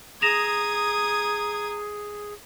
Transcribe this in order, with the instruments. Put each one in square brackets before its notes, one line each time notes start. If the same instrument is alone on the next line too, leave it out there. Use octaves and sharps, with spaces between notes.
[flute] G#4 [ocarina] A#5 [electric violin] D#6 G#6 [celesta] A#6 E7 F7